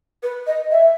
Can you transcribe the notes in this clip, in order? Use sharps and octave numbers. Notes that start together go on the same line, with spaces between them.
B4
D#5
E5